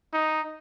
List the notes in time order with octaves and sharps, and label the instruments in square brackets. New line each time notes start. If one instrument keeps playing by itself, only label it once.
[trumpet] D#4